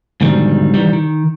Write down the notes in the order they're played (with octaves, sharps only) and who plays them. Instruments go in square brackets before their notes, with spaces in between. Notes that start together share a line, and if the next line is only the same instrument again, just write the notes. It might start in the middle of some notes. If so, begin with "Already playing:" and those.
[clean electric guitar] G#2 B2 D3 D#3 F3 G3
D#3 E3 G3
D#3